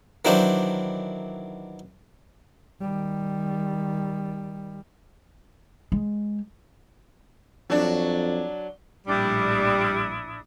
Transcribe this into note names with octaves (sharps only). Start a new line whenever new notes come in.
D#3 E3 F#3 D4 C5
D#3 G3
G#3
F2 F#3 D4
A#1 A2 G3 D4 E4 D#6